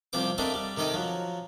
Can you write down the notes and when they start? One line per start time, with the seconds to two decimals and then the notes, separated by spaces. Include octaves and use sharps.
0.13 C2 C3 F3 C4 C5 D6
0.38 A3 A#3 C4 D4 C5 D#5
0.54 G3
0.77 C3 D#3 G4 A4 D#5
0.94 F3 F#3